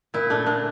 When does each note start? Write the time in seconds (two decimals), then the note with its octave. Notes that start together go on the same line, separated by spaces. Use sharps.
0.14 A#2 E4
0.30 A3 D4
0.46 A#2 D4